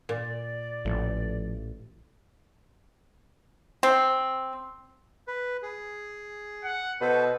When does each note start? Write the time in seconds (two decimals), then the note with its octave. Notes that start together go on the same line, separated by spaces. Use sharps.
0.09 A#2 D5
0.85 A1 F3 A3
3.83 C4
5.27 B4
5.62 G#4
6.64 F#5
7.01 B2 A4 B4 C5